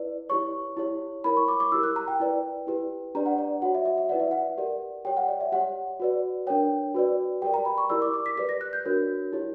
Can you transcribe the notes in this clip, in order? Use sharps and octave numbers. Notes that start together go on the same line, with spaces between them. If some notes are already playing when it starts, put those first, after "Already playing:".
Already playing: E4 B4 D5
E4 G4 C#5 C#6
E4 G4 C#5
E4 A#4 C#5 B5
C#6
D6
D6
E4 G4 A#4 E6
F#6
A#5
G5
E4 B4 D5
E4 G4 B4
D4 G4 B4 D5 A#5
F#5
D5
F#4 C#5 F#5
E5
E5
E5
E4 B4 D5 F#5
E5
F#5
G4 A#4 D5
G4 C#5 G5
F#5
D5
E5
G4 C#5 F#5
F#4 B4 D5
D4 A#4 C#5 G5
F#4 B4 D5
G4 A#4 D5 G5
A#5
B5
C#6
E4 G4 A#4 D5 E6
D6
D6
B6
G4 B4 D5 B6
A#6
F#6
G6
D4 F#4 A#4 C#5
E4 G4 C#5